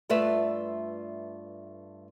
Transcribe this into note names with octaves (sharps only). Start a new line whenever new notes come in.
G2 A3 F4 B4 D5 E5